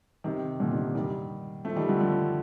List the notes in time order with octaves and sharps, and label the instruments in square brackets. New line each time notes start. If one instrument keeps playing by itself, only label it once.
[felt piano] C3 D#3
A#2 D3
C3 D#3
D#3 G3
F3 A3
D#3 G3
D3 F3
D3 F3